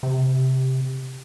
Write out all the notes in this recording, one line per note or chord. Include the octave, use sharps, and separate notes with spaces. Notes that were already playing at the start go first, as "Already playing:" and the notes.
C3